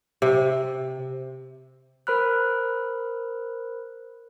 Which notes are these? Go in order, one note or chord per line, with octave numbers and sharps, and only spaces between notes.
C3
A#4 C5 B5 F6 F#6